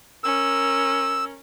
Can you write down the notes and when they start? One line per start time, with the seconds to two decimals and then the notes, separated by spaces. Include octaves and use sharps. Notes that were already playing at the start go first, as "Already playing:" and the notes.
0.24 C#4 A#4 E6